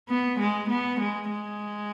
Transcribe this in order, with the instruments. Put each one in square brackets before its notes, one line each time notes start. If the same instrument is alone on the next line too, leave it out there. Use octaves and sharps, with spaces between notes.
[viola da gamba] B3
G#3
B3
G#3
G#3